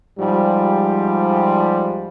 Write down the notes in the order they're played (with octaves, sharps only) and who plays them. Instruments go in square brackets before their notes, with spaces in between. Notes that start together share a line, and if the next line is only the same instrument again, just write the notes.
[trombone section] G#2 F3 G3